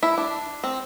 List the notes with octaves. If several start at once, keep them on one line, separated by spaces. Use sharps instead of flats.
E4
D4
C4